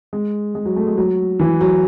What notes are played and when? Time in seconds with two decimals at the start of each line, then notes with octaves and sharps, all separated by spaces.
0.13 G#3
0.55 G#3
0.66 F#3
0.76 A3
0.87 G#3
0.97 F#3
1.40 E3
1.61 F#3